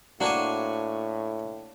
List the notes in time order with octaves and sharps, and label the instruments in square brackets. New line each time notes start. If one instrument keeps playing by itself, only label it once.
[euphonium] A2 [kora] A#3 D4 C5 [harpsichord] F#4 C#5 G#5